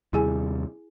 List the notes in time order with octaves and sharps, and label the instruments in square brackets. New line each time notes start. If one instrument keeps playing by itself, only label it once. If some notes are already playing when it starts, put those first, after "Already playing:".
[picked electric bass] D#2 C3 G3 [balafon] E4 G#4 G#5